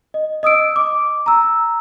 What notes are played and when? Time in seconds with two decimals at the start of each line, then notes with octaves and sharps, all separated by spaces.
0.14 D#5
0.43 D#5 D#6 E6 D7
0.76 D6
1.26 A#5 E6